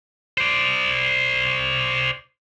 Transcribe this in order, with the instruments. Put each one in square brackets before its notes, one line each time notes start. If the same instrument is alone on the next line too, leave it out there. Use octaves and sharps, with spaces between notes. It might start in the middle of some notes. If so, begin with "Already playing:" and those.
[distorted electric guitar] C5 D5